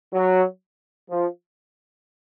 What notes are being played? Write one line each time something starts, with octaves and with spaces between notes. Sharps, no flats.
F#3
F3